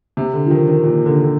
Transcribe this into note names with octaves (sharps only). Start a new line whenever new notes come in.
C3
D3
F3
D#3
D#3
A#2
D3
D3